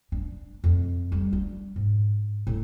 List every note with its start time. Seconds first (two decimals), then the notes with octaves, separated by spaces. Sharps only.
0.12 D4
0.64 F2
1.12 G3
1.33 D4
1.76 G#2
2.47 A2